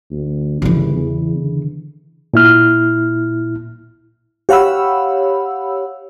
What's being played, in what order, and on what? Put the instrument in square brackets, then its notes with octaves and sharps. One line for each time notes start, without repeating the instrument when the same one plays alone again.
[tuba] D2
[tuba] G1 [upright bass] C#3 E3
[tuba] E2
D3
[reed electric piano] A#2 E4 F6
[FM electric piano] G4 C#5 F5 F#5 B5 E6